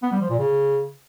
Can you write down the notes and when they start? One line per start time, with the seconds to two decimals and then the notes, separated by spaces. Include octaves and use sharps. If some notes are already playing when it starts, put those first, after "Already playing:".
0.03 B3
0.12 G3
0.21 F3
0.30 A#2
0.39 C#3